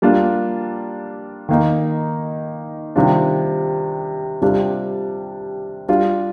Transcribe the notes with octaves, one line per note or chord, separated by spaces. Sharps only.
G3 A#3 D4 F4
D#3 A#3 D#4
C3 D#3 G3 D4 F4
C3 G3 D4 F4
G3 D4 F4